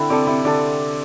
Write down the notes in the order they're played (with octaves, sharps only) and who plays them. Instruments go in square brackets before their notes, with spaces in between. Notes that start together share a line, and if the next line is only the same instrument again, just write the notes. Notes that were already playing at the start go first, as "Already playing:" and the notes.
Already playing: [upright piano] D3 [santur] C4 E4
[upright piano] C3 [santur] A4 D5
[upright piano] C3 [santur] E4
[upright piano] D3 [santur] A4 D5